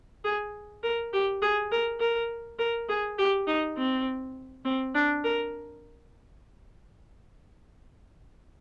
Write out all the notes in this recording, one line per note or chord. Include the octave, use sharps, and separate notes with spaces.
G#4
A#4
G4
G#4
A#4
A#4
A#4
G#4
G4
D#4
C4
C4
D4
A#4